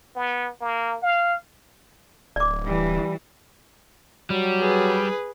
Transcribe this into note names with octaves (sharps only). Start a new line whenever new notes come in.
B3
A#3
F5
D1 D5 D6
E3 G3
F#3 G3
G#4 B4